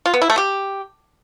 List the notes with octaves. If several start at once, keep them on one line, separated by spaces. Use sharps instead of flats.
F4
B3
E4
A3
G4